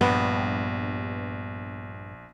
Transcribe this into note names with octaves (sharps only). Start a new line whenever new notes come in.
A#1 G2 B3